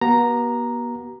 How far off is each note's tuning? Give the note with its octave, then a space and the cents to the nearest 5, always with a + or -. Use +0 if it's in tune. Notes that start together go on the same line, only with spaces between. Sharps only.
B3 -45 F#4 +45 A#5 +0